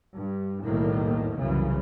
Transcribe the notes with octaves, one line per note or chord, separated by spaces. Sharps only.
G2
B1 E2 A2 D#3 G3 A#3
C2 F#2 C#3 E3